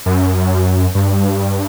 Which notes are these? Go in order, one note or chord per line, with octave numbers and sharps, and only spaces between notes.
F#2
G2